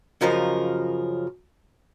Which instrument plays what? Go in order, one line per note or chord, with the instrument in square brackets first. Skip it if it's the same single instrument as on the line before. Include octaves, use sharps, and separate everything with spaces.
[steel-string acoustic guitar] F#2 C#3 F3 A#4 D#5